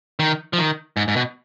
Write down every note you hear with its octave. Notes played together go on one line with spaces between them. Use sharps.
D#3
F3
D#3
G#2
G#2
B2